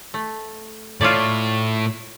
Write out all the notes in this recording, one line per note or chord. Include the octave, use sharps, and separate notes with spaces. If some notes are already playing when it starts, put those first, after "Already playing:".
A3
A2 F4 C#5 D5